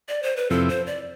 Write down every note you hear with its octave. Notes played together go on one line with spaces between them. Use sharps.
D5
C5
B4
F2 C3 F3 C4 E4 A4
C5
D5